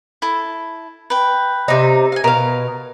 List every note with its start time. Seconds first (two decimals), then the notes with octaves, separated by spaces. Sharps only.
0.22 E4 A4
1.10 B4 G5
1.68 C3 D#4
2.12 F5 G#5
2.24 B2 A#4 F5